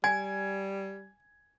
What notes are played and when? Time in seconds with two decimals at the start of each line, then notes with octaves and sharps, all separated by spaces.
0.04 G3 G#5 G#6